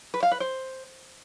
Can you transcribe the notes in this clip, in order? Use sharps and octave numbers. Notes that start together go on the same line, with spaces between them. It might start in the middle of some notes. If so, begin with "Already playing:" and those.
B4
F5
B4
C5